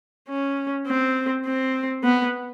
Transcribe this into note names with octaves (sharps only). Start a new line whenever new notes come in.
C#4
C4
C4
B3